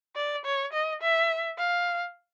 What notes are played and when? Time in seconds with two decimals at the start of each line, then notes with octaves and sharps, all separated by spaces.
0.16 D5
0.45 C#5
0.73 D#5
1.02 E5
1.58 F5